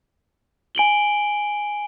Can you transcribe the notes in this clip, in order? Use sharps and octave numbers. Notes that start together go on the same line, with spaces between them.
G#5 D7 F#7 G7